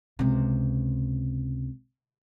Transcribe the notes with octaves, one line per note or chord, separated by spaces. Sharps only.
C#2 C3